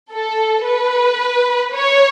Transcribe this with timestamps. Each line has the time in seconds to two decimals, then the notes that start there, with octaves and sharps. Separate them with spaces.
0.13 A4
0.66 B4
1.74 C#5